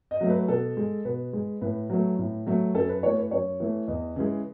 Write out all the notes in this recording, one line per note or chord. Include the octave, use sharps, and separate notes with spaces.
D#5
F#3 A3
B4
B2 A4
G#3
B2 B4
G#3
A2 B4
F#3 A3
A2
F#3 A3
F#2 A4
B4
E3 A3 C#5
B4
F#2 C#5
E3 A3
E2 D#5
C#3 E3 G#3